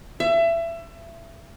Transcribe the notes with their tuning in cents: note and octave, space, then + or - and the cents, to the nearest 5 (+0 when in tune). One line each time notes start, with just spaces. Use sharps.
E5 +25